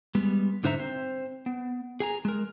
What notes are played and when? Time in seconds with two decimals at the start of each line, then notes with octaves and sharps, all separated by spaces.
0.15 G3 G#3 B3
0.63 G#2 D3 D#4 C5 E5 A#5
0.80 C4 C5
1.46 B3
2.00 G#4 G#5 A#5
2.25 G#3 A#4